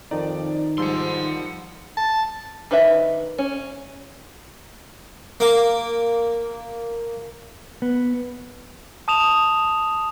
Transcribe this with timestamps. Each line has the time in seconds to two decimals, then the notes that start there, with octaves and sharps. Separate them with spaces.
0.11 F2 D#3 D#4 D5
0.78 G#2 F3 G3 F#5 C6 E6
1.97 A5
2.71 D#3 D4 B4 D#5 E5
3.38 C#4
5.40 A#3 D6
7.82 B3
9.08 A5 D#6 E7 F7